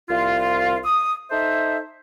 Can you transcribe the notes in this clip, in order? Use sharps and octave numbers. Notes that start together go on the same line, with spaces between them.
C2 F4
D#6
D#4 A4 C5 E5